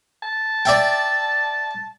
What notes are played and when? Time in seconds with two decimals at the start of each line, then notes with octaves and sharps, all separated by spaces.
0.23 A5
0.65 D5 E5 G5